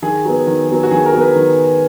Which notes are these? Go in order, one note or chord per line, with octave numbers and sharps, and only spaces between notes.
D#3 G#4
F#3 B3
D#3
F#3 B3
F#4
D#3 G#4
A#4
F#3 B3
B4
D#3